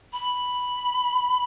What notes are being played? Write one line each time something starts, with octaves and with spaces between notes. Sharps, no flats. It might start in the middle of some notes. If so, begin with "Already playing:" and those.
B5